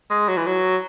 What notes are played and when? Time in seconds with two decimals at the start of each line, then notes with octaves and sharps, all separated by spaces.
0.10 G#3
0.29 F#3
0.37 E3
0.46 F#3